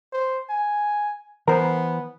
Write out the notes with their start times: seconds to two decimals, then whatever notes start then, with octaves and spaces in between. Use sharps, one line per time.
0.13 C5
0.49 G#5
1.48 E3 B3 A#4 C5